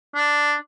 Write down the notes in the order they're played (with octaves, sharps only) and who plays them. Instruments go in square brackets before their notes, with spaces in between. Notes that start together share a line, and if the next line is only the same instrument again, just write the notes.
[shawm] D4